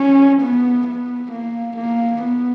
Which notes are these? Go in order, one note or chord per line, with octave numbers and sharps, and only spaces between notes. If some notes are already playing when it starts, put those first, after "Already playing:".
Already playing: C#4
B3
B3
A#3
A#3
B3